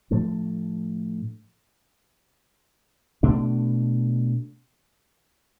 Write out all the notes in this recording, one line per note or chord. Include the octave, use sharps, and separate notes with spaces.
A2 F3 A3 D4
B2 A3 D4